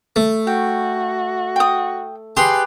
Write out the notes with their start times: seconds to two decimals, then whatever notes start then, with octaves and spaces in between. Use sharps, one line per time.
0.16 A3
0.47 F#4 G5
1.56 G5 D#6
2.37 G4 G#4 B4 A5 C6